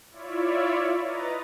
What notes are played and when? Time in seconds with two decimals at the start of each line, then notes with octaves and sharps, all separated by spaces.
0.11 E4 F4 C#5 D5 E5
1.03 B4 D#5 A#5 D#6 A6